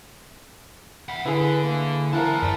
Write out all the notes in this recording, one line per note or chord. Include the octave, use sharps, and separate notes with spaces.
E5 F#5 B5
D3 E4 G#4 B4
A#3
E4 A#4 C5 F#5 A5
F#2 D5 E5 A5